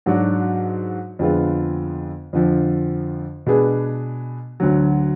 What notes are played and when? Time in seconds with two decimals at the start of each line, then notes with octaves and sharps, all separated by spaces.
0.06 G#2 F#3 D4 F#4
1.19 F2 D3 G#3 B3 F4
2.33 F2 D3 F3
3.46 B2 G#3 D4 G#4 B4
4.60 D2 D3 F#3